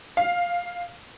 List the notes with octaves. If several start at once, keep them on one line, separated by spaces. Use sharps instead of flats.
F5